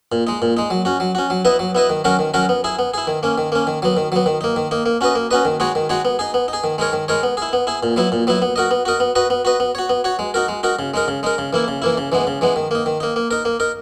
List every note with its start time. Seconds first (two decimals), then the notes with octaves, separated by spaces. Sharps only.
0.12 A#2
0.27 G#3 D#4
0.42 A#2
0.57 G#3 D#4
0.70 F#3
0.85 C#4 F#4
1.00 F#3
1.15 C#4 F#4
1.30 F#3
1.45 B3 E4 B4 D#5
1.59 F#3
1.75 B3 E4 B4 D#5
1.90 D#3
2.04 F#3 C#4 F#4 A#4
2.19 D#3
2.34 F#3 C#4 F#4 A#4
2.49 B3
2.64 E4 G#4
2.79 B3
2.94 E4 G#4
3.07 D#3
3.23 A#3 C#4
3.38 D#3
3.52 A#3 C#4
3.67 D#3
3.82 F#3 B3
3.97 D#3
4.12 F#3 B3
4.26 D#3
4.41 A#3 D#4
4.56 D#3
4.71 A#3 D#4
4.86 A#3
5.01 C#4 F#4 B4 D#5
5.15 A#3
5.31 C#4 F#4 B4 D#5
5.45 D#3
5.60 G#3 D#4 F#4 C#5
5.75 D#3
5.89 G#3 D#4 F#4 C#5
6.05 B3
6.19 D#4 G#4
6.34 B3
6.48 D#4
6.53 G#4
6.64 D#3
6.78 G#3 D#4 A#4 C#5
6.93 D#3
7.08 G#3 D#4 A#4 C#5
7.23 B3
7.37 E4 G#4
7.53 B3
7.67 E4 G#4
7.83 A#2
7.96 F#3 B3 E4
8.12 A#2
8.27 F#3 B3 E4
8.42 B3
8.56 F#4 A#4 D#5
8.71 B3
8.85 F#4 A#4 D#5
9.00 B3
9.15 F#4 B4 D#5
9.30 B3
9.45 F#4 B4 D#5
9.60 B3
9.75 F#4 C#5
9.89 B3
10.04 F#4 C#5
10.19 G#3
10.34 D#4 F#4 A#4
10.48 G#3
10.63 D#4 F#4 A#4
10.79 C#3
10.94 G#3 D#4 A#4
11.08 C#3
11.23 G#3 D#4 A#4
11.38 C#3
11.53 E3 A#3 E4
11.68 C#3
11.82 E3 A#3 E4
11.98 C#3
12.12 E3 G#3 B3
12.27 C#3
12.41 E3 G#3 B3
12.56 D#3
12.71 A#3 D#4
12.86 D#3
13.00 A#3 D#4
13.16 A#3
13.31 D#4 A#4
13.45 A#3
13.60 D#4 A#4